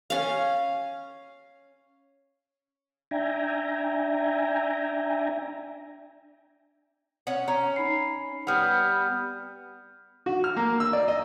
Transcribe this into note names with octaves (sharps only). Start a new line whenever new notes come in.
C#4 F5
D4 E5 G5 G#5 A#5
C#4 C#5 F#5
C#4 A#5
D#4 B5 C7
G3 B3 F#5 F6 G6
F#4
F6
A#3
E6
D5
D#5